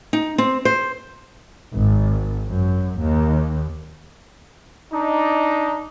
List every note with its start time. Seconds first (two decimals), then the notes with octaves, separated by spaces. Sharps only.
0.13 D#4
0.38 C4
0.65 C5
1.74 G#1
2.47 F#2
2.97 D#2
4.93 D4 D#4